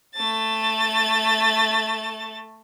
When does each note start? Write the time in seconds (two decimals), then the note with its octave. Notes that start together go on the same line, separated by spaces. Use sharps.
0.15 A3 A6